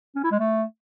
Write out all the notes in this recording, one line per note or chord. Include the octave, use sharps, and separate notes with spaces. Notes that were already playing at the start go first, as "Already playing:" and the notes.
C#4
E4
G#3
A3